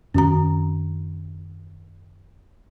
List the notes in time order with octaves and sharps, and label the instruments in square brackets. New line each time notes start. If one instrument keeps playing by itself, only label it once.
[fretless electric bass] F#2 D#3 C4 [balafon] C#4 F#4 A#5